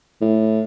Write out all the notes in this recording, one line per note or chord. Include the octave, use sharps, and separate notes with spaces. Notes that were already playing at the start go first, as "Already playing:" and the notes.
A2